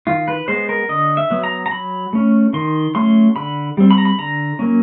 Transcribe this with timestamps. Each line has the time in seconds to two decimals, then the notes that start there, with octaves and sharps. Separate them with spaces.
0.07 D#3 F4
0.28 B4
0.48 G#3 B3 C5
0.69 A#4
0.89 D3 D#5
1.17 E5
1.30 F#3 B3
1.44 A#5
1.66 A#5
1.71 F#3 B5
2.13 A3 C#4
2.53 D#3 C6
2.95 F#3 A3 C#4 C6
3.36 D3 B5
3.77 G3 C4
3.91 B5
3.98 A#5
4.05 B5
4.18 D3 A#5
4.59 F#3 A#3 C#4